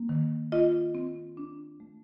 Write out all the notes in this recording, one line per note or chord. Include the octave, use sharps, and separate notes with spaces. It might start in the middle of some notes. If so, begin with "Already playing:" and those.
Already playing: A#3
D#3
F4 D#5
C4
D4
A3